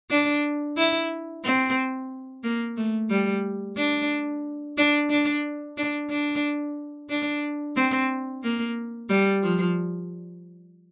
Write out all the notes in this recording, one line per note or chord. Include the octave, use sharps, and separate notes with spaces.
D4
E4
C4
A#3
A3
G3
D4
D4
D4
D4
D4
D4
C4
A#3
G3
F3